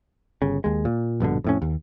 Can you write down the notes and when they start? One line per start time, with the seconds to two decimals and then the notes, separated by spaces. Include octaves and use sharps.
0.42 G1 C#3
0.64 D#2 G#3
0.85 A#2
1.20 A#1 G2 B2 D3
1.44 F2 A2 C#4
1.62 D#2